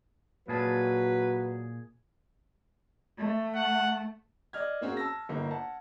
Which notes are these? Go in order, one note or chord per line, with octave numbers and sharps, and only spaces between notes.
A#2 F#3 G#4 B4 A5
A3
F#5
D5 D#5 F6 G#6
A#3 C4 C#4 F#4 G#4
A5 E6 A#6
G1 A#3 D#4
F#5 A5